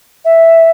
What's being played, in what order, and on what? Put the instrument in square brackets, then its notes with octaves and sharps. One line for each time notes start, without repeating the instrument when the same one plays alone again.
[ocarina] E5